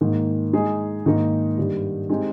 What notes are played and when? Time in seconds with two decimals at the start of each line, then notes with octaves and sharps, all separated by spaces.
0.01 G#2 D#3 A#3
0.53 G#3 D#4 G#4
1.06 G#2 D#3 A#3 D#4
1.57 G2 D#3 G3
2.09 G#3 C4 D#4 G4